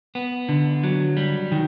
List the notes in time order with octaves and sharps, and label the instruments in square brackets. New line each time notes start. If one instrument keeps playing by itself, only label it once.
[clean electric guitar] B3
D3
F#3
G3
D#3